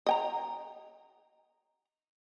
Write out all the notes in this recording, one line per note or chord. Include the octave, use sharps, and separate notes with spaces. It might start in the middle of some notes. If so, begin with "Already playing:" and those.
D#5 G5 A#5